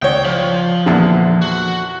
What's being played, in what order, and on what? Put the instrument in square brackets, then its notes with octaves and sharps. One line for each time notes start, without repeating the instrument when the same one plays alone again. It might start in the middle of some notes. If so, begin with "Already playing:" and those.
[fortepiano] C#2 C#5 D5 [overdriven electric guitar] G5
[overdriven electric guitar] F3
[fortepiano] E2 A#2 D3
[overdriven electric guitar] F#4